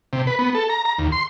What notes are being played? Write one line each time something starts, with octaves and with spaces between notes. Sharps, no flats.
C3
B4
B3
A4
A#5
A#5
D#2
C6